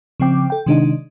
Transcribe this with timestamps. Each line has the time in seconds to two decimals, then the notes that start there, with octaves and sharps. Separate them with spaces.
0.20 C#3 F3 C4 G5 D6
0.50 A4 G5
0.66 C3 D#3 G#3 D4 D#4 D#5